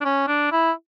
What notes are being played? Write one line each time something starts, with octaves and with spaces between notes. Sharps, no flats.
D4
C#4
D4
E4